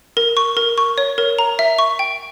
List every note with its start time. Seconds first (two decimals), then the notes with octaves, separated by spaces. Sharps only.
0.17 A#4
0.37 C#6
0.57 A#4
0.78 C#6
0.98 C#5
1.18 A#4
1.39 A#5
1.59 E5
1.79 C#6
1.99 G5